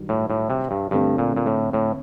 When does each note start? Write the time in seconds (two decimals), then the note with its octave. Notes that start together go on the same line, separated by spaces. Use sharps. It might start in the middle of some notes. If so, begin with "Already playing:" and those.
Already playing: G2 D#3 F#3
0.09 A2
0.30 A2
0.50 C3
0.71 G2
0.91 G2 D3 A3 C4
1.18 A#2
1.37 A#2
1.46 A2
1.73 A2